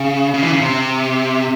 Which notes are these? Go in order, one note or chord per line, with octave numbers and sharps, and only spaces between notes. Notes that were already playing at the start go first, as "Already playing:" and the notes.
Already playing: C#3
C#3
E3
C#3
C3